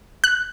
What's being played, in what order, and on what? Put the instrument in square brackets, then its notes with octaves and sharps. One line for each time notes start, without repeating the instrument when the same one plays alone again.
[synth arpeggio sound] F#6